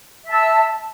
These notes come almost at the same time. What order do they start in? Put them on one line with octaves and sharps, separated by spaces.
E5 A5 E6